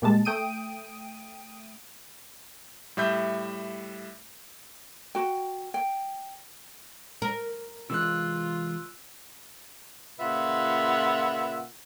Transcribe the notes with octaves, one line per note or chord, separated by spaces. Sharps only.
A#2 G3 G#3 A5
A3 G5 D#6 D7 D#7
A2 G3 E5 G6
F#4 G5
G5
A#4
C3 E3 G#3 F4 E6 F#6
A#2 C#3 F4 B4 E5 F#5